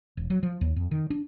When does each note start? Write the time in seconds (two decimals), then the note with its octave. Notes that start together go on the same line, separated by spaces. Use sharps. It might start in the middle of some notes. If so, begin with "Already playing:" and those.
0.17 E1
0.30 F#3
0.43 F3
0.61 D#2
0.76 F2
0.91 D#3
1.10 D4